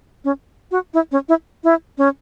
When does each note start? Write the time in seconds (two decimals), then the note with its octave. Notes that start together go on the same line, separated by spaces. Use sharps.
0.24 C#4
0.71 F#4
0.94 E4
1.12 C#4
1.28 E4
1.64 E4
1.98 C#4